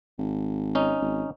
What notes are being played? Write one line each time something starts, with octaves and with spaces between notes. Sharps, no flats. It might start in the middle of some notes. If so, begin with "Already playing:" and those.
G#1
C#4 D#4
G#1